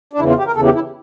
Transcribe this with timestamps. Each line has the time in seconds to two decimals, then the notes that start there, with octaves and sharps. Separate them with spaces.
0.13 D4
0.19 E2 C#3 E3 E4
0.29 F4
0.38 G4
0.47 A#4
0.56 E2 C#3 E3 A4
0.65 G4
0.75 E4